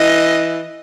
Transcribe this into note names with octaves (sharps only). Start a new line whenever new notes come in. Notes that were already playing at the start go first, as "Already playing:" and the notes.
Already playing: E3 D#5